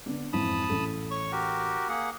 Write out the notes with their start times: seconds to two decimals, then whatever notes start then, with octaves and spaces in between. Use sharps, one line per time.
0.06 D3 B3 D4
0.33 F2 G#2 E3 A5 B5 D#6
0.70 A1 A4
1.11 C#5 C#6
1.32 F#4 G4 A#4
1.89 A#3 G#4 F#5